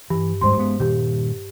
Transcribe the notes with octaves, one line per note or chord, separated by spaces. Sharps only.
G2 E3
D2 G#2 G3 C5 C6
G#3 B3
A#2 D#3 G4